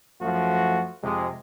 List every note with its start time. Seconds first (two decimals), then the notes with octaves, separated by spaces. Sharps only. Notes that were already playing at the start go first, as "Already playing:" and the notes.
0.21 F#2 F3 A3 F#4
1.03 F2 C3 G#3